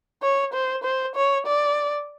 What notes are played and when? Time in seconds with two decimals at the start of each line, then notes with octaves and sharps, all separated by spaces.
0.22 C#5
0.54 C5
0.84 C5
1.16 C#5
1.46 D5